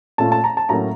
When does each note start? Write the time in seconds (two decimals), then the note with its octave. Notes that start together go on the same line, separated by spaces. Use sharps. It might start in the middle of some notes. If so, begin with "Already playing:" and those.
0.18 A#2 A3 C#4 F4 A5
0.32 A5
0.44 A#5
0.57 A5
0.69 A2 F#3 A#3 C#4 A#5